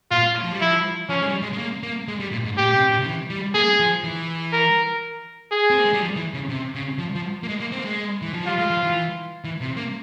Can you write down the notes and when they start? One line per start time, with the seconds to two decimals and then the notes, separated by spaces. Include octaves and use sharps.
0.11 A#2 F4
0.44 F3
0.52 G3
0.61 F3 E4
1.09 F3 C#4
1.22 G#3
1.26 G3
1.42 G#3
1.53 G#3
1.58 A#3
1.83 A#3
2.08 G#3
2.20 G3
2.32 A#2
2.45 G#2
2.57 A#2 G4
2.74 C3
2.90 A#2
3.00 C#3
3.06 E3
3.30 G3
3.54 A#3 G#4
3.80 F3
4.04 E3
4.53 A#4
5.52 G#4
5.70 C4
5.77 A#3
5.85 G#3
5.93 G3
6.01 F3
6.16 E3
6.34 C#3
6.49 C3
6.75 C#3
6.98 F3
7.15 F3
7.43 A#3
7.48 G#3
7.60 A#3
7.72 C4
7.79 A#3
7.85 G#3
8.22 E3
8.34 F3
8.45 G3 F4
8.58 G#3
8.70 F3
8.83 E3
9.44 E3
9.61 C3
9.77 A#3